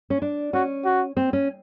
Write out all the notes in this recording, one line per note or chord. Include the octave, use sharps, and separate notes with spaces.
C#4
D4
C#4 F#4
F#4
C4
C#4